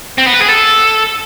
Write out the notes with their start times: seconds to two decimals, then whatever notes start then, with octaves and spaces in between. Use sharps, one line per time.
0.18 C4
0.26 B3
0.34 B4
0.41 G#4
0.49 A4